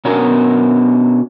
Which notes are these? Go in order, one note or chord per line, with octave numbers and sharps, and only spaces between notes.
B2 B3 C#4 D4 F#4 A#4